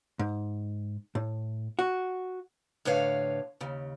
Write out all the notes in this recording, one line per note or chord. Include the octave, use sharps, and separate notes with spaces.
G#2
A2
F#4
A2 D3 B4 C#5 F5
D#2 C#3